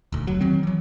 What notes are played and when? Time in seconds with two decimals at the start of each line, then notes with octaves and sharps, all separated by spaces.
0.12 D#1 D2
0.27 F1 F#3
0.41 D#3 F#3 C4
0.63 E3 F#3